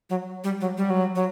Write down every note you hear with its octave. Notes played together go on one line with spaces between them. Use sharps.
F#3
G3
F#3
G3
F#3
F#3